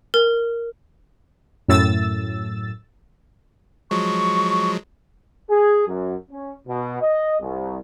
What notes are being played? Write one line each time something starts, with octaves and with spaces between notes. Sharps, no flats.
A#4
F#2 A2 E6 A6
F3 F#3 G#3 C#6
G#4
F#2
C#4
B2
D#5
C2